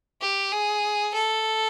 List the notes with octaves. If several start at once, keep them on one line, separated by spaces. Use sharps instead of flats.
G4
G#4
A4